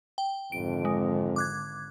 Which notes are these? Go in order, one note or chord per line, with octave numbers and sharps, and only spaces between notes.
G5
G#1 F2 D3 D7
G#3
D6 F#6 G#6